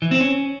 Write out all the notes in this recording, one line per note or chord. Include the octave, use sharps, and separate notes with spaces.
E3
C4
C#4